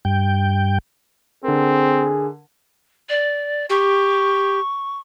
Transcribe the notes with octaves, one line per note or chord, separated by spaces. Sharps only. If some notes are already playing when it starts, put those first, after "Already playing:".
G2 G5
D3 C4 G#4 A#4
D5
G4 C#6